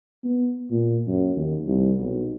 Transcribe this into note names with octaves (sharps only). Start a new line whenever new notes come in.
B3
A#2
F#2
D#2
C2
B1